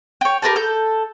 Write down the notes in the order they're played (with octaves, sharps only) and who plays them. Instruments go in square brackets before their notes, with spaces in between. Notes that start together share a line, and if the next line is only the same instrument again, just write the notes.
[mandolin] C#5 G5
G4 A#4 B4 A5
A4 G6